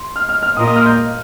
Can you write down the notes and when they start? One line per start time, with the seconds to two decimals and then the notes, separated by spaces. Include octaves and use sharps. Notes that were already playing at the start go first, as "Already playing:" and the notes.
Already playing: C6
0.16 F6
0.29 F6
0.43 F6
0.56 A#2 A#3 F4 A#4 D#5 D#6
0.67 D#6
0.76 F6
0.86 G6